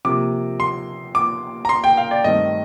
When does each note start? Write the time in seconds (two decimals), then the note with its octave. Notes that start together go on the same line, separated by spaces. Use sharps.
0.05 C3 F3 A#3 D6
0.60 C6
1.15 D6
1.65 A#5
1.69 C6
1.84 G5
1.97 F5
2.11 D5
2.24 G2 D#3 A3 C4 D#5